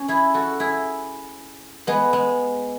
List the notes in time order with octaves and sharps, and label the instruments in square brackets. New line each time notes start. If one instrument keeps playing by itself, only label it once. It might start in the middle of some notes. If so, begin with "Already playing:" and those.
Already playing: [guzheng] C#4
E4 G#4
F#4 A4
E4 G#4
G#3 B3
G#3